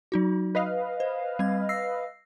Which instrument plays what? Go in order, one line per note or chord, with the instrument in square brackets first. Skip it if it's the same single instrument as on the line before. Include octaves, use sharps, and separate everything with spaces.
[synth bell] F#3 D#4 F#4
[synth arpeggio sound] B4 D#5 F5
[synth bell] C5
G3 C4 G#6
E6 A#6 C7